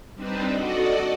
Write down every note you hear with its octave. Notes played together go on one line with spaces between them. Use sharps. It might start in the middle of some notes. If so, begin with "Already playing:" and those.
G3 C4 D4 D#4 B4 C5
F#4 A4 D5 D#5 F#5